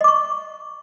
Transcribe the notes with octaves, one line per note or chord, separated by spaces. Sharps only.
D#5 C#6 D6